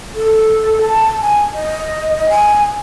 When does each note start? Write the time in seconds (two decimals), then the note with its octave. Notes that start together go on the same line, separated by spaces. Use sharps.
0.15 A4
0.81 A5
1.21 G#5
1.53 D#5
2.29 G#5